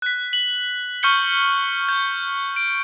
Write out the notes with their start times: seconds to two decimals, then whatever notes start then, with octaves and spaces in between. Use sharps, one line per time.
0.02 F#6 B6
0.33 F#7
1.03 C#6 F6 G6 C#7 G7
1.89 G6
2.56 D7